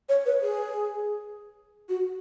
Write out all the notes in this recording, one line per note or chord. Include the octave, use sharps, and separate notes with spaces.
C#5
B4
G#4
F#4